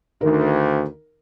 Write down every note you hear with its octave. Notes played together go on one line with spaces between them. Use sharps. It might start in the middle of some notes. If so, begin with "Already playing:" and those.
D2 D#3 A#4